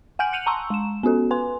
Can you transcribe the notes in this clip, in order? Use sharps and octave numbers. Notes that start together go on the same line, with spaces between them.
F#5 G#5 F6 G6 D7 F#7
F#6 C#7 D#7 F7 F#7
A5 A#5 C6 C#6 E6
G#3 E7
B3 C#4 F#4 A4
B4 G#5 C6